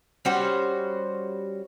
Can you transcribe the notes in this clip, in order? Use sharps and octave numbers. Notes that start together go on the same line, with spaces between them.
G3 C#4 F#4 C5